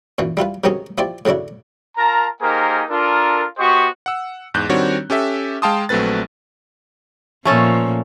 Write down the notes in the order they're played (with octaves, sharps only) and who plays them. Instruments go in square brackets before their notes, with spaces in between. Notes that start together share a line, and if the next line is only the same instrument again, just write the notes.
[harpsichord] F#2 A#2 E3
G3 E4 F4 B4
C3 D#3 F#3 G#3 C#4 G#4
F3 E4 G4 C5 D5
A2 C#3 F#3 D4 E4
[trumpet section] F4 A#4 A5 A#5
A#3 D#4 G4 G#4 A#4 C5
D4 F4 A4 A#4
B3 F#4 G4 C5 D#5 C#6
[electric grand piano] F#5 E6
E2 G#2 F#6 G6
D#3 G3 C4 D4 F#4 C#5
C#4 G4 A4 E5
G#3 F5 G5 A5 C6 D#6
A#1 F#3 A3 C4 B4 A6
[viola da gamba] A#2 F3 [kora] A3 C#4 A4